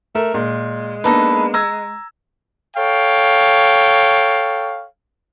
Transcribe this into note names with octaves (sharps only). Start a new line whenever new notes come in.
A3 A#4
A#2 G#3
A#3 B3 D4 D#4 A4 B4
A#5 E6 G#6
A4 C#5 F5 G5